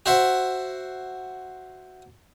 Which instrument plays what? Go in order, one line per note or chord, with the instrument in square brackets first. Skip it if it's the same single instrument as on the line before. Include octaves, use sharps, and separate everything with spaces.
[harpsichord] F#4 C5 E5 F#5